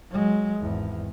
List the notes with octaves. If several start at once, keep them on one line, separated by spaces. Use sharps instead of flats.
F#3 G#3
G#1 E2